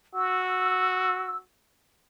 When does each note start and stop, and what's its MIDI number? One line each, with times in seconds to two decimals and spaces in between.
0.14 1.43 66
0.14 1.38 88